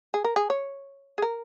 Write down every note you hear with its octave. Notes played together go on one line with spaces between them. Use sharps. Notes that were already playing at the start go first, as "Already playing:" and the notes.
G#4
A#4
G#4
C#5
G#4
A#4